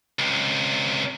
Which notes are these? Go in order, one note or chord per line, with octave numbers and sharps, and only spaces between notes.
C#2 C3